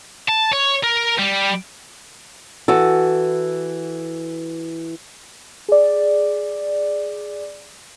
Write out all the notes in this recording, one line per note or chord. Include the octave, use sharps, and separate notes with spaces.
A5
C#5
A#4
G3
E3 F#4 A4
G#4 D5